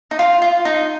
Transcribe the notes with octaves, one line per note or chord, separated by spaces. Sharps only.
D#4
F4
F4
D#4